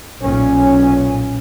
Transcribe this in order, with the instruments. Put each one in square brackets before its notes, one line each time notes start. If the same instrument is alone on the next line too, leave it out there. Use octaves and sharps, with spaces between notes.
[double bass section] B1 A#2 C#4